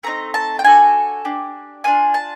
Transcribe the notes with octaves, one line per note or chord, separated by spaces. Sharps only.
A3 C4 D#4 A#5
A5
G5
D4 F#4 A4 G#5
D4 G4
D4 F4 G#4 G#5
A5